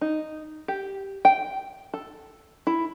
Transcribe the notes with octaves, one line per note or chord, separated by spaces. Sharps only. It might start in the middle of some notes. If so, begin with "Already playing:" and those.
D#4
G4
G5
A4
E4